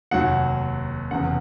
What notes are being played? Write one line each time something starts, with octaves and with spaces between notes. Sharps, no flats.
F1 D#2 D#3 F#3 F#5
F1 E2 C#3 F#5